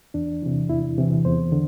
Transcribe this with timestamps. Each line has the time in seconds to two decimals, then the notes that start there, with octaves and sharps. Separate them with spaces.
0.14 E2 D4
0.42 C3 E3
0.69 E2 E4
0.98 C3 E3
1.25 E2 C5
1.52 D3